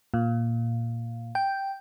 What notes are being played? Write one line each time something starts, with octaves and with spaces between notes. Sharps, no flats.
A#2
G5